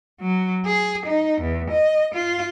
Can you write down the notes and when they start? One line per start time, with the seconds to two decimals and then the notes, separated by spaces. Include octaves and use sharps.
0.21 F#3
0.66 G#4
1.06 D#4
1.41 E2
1.71 D#5
2.15 F4